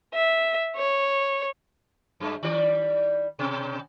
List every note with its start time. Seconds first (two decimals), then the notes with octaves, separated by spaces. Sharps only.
0.15 E5
0.77 C#5
2.20 F#2 G#3
2.43 D#3 G3 D5
3.39 B2 C#4